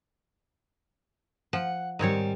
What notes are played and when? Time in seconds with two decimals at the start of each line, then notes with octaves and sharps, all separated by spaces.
1.53 F3 F#5
1.99 G#2 D#3 G3 C4 C#5